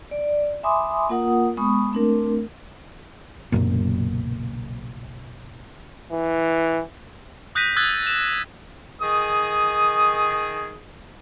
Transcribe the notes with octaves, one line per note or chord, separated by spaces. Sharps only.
D5
E5 G#5 B5 C6 D6 D#6
A#3 F4 A#4 F#5 D#6
G#3 B3 B5 C#6 D#6
A3 C4 D4 A#4
F#1 B1 F#2 A#2
E3
D#6 F#6 G6 A#6 B6 D#7
D#6 E6 F#6 G#6 A6
E7
D#3 G#4 D#6